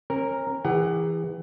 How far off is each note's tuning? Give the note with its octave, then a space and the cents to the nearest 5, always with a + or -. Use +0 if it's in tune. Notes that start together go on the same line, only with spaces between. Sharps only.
C#4 -40 A#4 +0
E3 +0 G#4 -40 F#5 +30